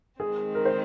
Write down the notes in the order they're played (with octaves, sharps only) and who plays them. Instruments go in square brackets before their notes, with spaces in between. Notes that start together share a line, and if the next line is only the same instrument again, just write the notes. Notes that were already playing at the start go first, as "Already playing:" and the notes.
[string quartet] D#3 G#3 C4 [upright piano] G#4
[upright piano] A#4
C5